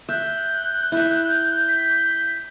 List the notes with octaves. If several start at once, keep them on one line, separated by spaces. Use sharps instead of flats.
E5 F#6 G6
E4 E5
B6